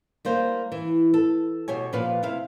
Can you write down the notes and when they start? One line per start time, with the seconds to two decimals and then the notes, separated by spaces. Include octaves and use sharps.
0.25 G3 A#3 C5
0.72 E3
1.14 A4
1.68 B2 G4 C#5 G#5
1.93 A#2 F3 B4 F5
2.23 C3 E4 F5